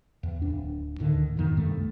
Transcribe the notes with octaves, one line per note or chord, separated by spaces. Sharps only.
E2
D1 D4
D2 A2 D3 D#3
F2 G#2 B2 D#3
C2 G2 A3